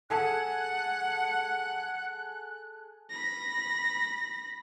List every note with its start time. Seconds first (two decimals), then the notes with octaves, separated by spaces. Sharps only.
0.10 G#4 A4 F#5 G#5 F#6
3.10 B5 A#6